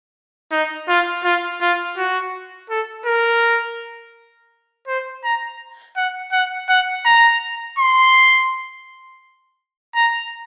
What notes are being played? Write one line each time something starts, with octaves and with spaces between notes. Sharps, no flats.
D#4
F4
F4
F4
F#4
A4
A#4
C5
A#5
F#5
F#5
F#5
A#5
C6
A#5